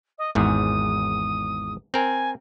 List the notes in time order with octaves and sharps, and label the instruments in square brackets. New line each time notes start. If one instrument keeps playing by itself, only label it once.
[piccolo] D#5
[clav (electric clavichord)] G#1 E2 G#2 [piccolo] D#6
[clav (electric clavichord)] C4 A#4 [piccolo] G#5